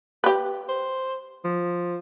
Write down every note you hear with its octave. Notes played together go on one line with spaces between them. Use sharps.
G4 B4
C5
F3